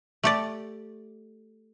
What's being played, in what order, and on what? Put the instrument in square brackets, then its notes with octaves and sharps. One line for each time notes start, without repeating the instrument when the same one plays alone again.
[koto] A3 G4 D5